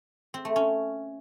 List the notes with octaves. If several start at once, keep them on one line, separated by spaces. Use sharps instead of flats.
C4
A3
C#4